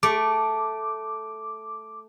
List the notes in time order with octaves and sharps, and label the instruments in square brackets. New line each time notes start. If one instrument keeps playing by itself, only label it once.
[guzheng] A3 [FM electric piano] D6